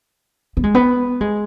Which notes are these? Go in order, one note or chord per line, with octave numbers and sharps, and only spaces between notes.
B3
G#3
B3
G#3